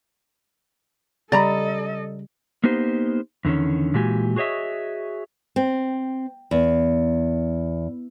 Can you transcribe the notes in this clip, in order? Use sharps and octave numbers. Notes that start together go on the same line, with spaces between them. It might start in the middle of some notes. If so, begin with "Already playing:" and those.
C#3 G3 A4 D5 D#5 A#5 B5
A#3 B3 D#4 G4 C5
E2 D3 D#3 C#4
A#2 E3 G#3 F#4 G4 G#5
F#4 G#4 C#5 D#5 E5
C4
E2